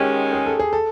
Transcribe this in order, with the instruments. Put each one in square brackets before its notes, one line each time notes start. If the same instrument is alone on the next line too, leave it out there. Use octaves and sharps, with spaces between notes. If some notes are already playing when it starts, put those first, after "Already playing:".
Already playing: [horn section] G#2 D#3 G#3 C#4 [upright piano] G4
[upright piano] G#4
A4
G#4
A4